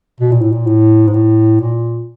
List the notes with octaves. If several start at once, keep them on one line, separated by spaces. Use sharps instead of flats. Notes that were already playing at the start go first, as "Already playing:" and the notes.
B2
A#2
A2
A#2
A2
G#2
A2
A#2